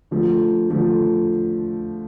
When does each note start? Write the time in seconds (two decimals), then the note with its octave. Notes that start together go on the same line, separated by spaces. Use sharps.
0.11 D3 F3 A3
0.70 D3 F3 A3